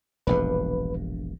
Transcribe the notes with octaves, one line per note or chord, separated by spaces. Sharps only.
E1 A#1 G2 B4